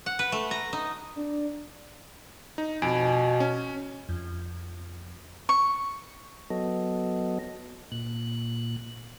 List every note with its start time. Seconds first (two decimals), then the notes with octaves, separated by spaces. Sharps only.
0.06 F#5
0.19 B4
0.32 A3
0.51 A#5
0.73 D#4
1.16 D4
2.58 D#4
2.82 F2 B2 G#5 D7
3.40 C#4
4.09 F2
5.49 C#6
6.50 F#3 B3 A4 D#5
7.92 A#2 F#6